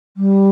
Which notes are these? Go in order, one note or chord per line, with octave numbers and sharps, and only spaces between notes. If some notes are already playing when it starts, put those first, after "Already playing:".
G3